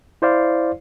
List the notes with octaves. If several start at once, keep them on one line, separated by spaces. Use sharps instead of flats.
E4 C5 D5 F5